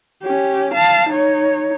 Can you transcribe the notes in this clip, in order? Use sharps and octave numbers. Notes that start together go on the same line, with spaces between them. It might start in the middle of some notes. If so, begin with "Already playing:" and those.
C#4 G4
F5 A5
D#4 C#5